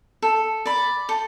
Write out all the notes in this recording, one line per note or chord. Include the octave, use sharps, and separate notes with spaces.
A4
D5 B5
A4